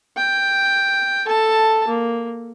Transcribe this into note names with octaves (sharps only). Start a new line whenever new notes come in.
G5
A4 A5
A#3